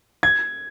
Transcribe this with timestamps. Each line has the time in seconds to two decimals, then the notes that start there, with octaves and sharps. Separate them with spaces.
0.23 G#6